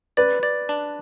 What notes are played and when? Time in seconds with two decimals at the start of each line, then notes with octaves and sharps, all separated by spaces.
0.17 B4 D5
0.43 D5
0.69 D4